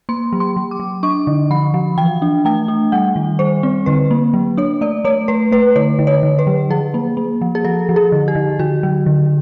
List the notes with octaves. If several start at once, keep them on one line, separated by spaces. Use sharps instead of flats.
A#3 C6
F#3
C6
F#3
D6
F#3
D4 C#6
D3
F3 B5
F3
E3 G5
D4
A3 G5
D4
G3 F#5
D#3
G3 C5
C4
D3 B4
A#3
F#3
D4 C#5
A3 D5
A3 C#5
A3 B4
A3 B4
D3 C#5
D3
C#5
D3
B4
F#3
F3 G#4
A#3
A#3
F3
G#4
F3 A4
F3
G#4
D3
G4
D3
D3 F#4
F#3
D3